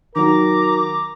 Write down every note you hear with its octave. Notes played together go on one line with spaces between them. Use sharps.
D#3 F#3 A#4 A#5 D6